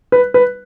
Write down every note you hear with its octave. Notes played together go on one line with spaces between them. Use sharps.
B4
B4